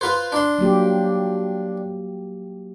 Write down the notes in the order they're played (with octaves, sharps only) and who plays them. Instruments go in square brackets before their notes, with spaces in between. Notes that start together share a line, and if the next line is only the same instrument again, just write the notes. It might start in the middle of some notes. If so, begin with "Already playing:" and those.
[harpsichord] F4 B4 C5
D4 C6
[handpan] F#3 A#3 G4